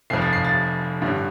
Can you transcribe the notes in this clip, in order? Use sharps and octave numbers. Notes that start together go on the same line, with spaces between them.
F1 F2 F3 C7
A6
C7
A6
A1 G2 D3